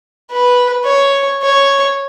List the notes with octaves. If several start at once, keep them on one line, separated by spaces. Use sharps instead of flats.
B4
C#5
C#5